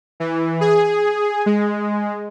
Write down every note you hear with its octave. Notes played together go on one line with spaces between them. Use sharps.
E3
G#4
G#3